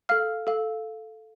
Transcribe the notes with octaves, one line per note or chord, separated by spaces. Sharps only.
A4 F5 F6
A4 F5